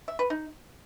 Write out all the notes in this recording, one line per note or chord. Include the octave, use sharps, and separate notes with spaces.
E5
B4
D#4